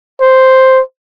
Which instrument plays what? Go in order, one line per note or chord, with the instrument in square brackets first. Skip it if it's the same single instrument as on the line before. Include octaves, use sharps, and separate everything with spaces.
[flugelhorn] C5